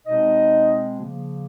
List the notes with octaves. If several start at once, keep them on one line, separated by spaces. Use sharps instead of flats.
B2 G#3 C4 D#4 D#5
C#3 F3 A#3